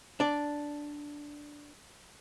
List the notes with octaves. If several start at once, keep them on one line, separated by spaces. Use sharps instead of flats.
D4 D5